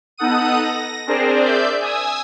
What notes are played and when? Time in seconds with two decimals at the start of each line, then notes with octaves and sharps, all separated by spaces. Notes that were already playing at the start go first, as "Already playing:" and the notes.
0.18 B3 D#4 A4 F#5 D#6 D#7
0.64 A#6
1.07 C4 D4 G#4 A#4 C5 D5
1.45 D5 E5 G6
1.81 G#5 D#6 E6